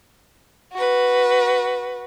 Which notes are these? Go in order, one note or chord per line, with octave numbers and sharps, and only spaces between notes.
F#4 B4